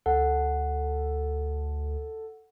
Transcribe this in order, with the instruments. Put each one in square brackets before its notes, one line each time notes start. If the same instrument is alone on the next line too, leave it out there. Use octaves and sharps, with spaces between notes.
[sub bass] D2 [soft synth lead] A4 [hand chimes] F#5